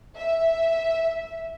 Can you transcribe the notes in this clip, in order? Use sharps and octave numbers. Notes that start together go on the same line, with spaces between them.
E5